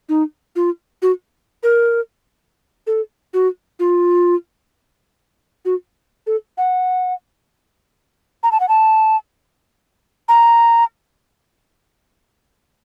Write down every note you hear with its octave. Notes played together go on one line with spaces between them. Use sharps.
D#4
F4
F#4
A#4
A4
F#4
F4
F#4
A4
F#5
A#5
A5
F#5
A5
A#5